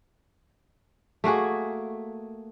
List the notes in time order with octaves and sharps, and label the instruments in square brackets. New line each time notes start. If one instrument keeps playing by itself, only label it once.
[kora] A3 A#3 F#4 G#4